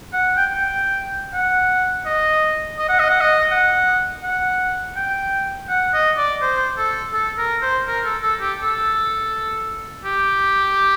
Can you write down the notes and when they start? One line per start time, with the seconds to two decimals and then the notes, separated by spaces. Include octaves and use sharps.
0.13 F#5
0.37 G5
0.54 G5
1.34 F#5
2.06 D#5
2.79 D#5
2.89 F#5
3.00 D#5
3.10 F#5
3.21 D#5
3.51 F#5
4.23 F#5
4.96 G5
5.69 F#5
5.94 D#5
6.17 D5
6.42 C5
6.78 A4
7.14 A4
7.38 A#4
7.62 C5
7.87 A#4
8.05 A4
8.23 A4
8.41 G4
8.60 A4
10.05 G4